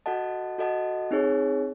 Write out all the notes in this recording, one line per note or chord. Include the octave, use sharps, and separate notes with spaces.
F#4 A4 D#5 F#5 A5
F#4 A4 D#5 F#5 A5
C4 D#4 G#4 C#5